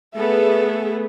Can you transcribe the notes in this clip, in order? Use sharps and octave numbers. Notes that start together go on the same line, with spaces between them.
A3 B3 G#4 A4 E5